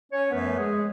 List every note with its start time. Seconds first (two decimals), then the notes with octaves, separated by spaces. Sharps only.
0.11 C#4 C#5
0.31 F#2 F3 A3 B3 B4
0.57 G#3 G#4